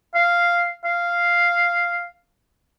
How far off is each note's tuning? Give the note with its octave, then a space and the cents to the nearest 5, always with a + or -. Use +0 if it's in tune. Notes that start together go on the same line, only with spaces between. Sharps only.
F5 -5
F5 -5